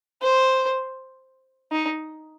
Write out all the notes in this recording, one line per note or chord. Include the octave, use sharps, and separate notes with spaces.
C5
D#4